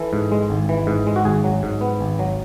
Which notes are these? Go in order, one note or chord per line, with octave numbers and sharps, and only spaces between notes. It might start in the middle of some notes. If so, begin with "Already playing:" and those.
Already playing: E3 A4
G#2
G#3
G#1
E3
G#2
G#3
F#4
G#1 G#4
F#3
G#2
B3
G#1
F#3